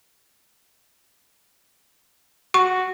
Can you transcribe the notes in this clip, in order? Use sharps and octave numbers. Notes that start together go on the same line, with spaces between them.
F#4 C#6